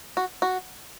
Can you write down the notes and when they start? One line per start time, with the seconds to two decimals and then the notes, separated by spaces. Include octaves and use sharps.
0.17 F#4
0.42 F#4